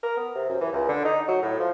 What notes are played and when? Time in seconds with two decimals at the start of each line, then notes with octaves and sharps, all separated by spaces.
0.03 A#4
0.17 B3
0.35 C3
0.49 F#2
0.61 E3
0.72 C#2
0.89 D3
1.05 D#4
1.28 F#3
1.42 A2
1.59 F3